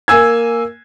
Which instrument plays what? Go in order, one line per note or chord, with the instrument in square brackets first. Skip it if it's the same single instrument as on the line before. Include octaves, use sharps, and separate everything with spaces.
[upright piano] A#3 G#5 E6 G#6